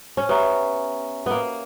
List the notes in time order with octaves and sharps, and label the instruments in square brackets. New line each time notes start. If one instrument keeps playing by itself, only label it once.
[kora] C#4
[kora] B3 [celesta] G4 C#5 E5 A#5 C#6
[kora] A#3 B3